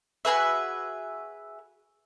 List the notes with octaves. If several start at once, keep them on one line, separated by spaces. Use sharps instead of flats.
F#4 G#4 B4 E5